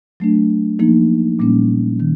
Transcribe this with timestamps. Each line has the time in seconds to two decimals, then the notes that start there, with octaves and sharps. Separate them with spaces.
0.20 F#3 A3 D4
0.79 F3 A#3 D#4
1.39 A#2 G3 A#3 C#4
2.00 D#3